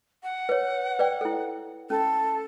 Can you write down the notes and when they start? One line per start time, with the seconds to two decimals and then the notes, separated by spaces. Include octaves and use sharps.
0.23 F#5
0.49 B4 C#5
0.99 B4 D5 G5
1.21 E4 A4
1.90 C#4 A4